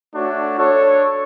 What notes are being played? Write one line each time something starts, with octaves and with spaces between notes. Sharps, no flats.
A3 D4 F#4 C#5
D4 A4 C#5